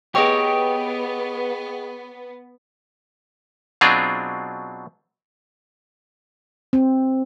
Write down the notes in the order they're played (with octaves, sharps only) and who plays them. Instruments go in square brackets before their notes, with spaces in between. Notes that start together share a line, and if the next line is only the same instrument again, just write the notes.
[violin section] B3 [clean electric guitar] G4 C#5 [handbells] G#4 D#5 G5
[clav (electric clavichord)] B2 F#3 C4 D4 F4 G#4
[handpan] C4